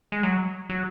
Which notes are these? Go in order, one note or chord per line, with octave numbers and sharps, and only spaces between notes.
G#3
F#3
F#3